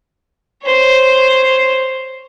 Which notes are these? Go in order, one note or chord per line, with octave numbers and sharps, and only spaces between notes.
C5 C#5